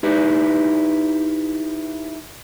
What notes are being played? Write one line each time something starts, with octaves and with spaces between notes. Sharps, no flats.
D#4 E4 G4 B4